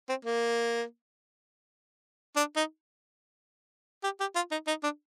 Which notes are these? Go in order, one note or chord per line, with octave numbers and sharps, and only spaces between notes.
C4
A#3
D4
D#4
G4
G4
F4
D#4
D#4
D4